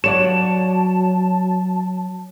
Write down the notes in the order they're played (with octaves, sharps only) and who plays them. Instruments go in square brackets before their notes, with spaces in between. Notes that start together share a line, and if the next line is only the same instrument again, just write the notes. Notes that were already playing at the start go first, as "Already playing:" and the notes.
[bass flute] F#3 [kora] C#5 D5 F#5 [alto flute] A5 [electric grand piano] E7